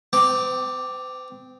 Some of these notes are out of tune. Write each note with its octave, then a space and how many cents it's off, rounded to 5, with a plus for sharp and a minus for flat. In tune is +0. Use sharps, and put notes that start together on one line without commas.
C4 -45 G5 +0 D6 +0